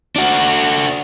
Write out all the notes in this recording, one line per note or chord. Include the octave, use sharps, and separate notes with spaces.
D4 F#4